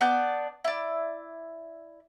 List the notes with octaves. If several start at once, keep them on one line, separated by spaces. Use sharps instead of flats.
B3 D4 D5 G6
E4 D5